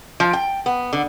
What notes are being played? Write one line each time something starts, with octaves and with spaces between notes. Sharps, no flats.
F3
G5
B3
D3